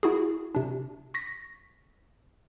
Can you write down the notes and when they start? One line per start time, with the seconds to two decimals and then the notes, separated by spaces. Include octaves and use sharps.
0.03 E4 F#4 G#4
0.55 C3 D4
1.14 C#6 A#6 B6